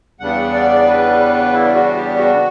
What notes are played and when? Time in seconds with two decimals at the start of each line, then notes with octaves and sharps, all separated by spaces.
0.20 E2 C#3 G3 B3 D4 F#5
0.54 D5
0.86 B4
1.53 E4
1.75 F#4
1.96 G4
2.18 F#4